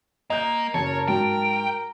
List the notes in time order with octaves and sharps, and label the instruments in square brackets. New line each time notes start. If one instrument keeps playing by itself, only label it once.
[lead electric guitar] A#3 [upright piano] D#5 [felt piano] A#5 G6
[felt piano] F#1 [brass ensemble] A#4 [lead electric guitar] C#5 [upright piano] A5
[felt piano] G#2 F#3 [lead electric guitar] G5